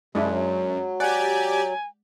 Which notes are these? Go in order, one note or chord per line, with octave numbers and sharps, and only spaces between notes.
F#2 C3 G#3 D4 E4
F#3
G4 D5 F#5 G#5